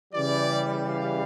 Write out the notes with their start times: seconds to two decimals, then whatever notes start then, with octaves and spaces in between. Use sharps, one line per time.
0.13 C#3 E3 G3 D5
0.87 F5